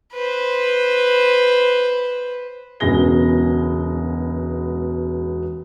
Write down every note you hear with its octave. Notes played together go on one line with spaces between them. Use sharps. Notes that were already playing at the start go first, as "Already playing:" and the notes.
B4 C5
E1 C#2 B2 G#5 A#6 G7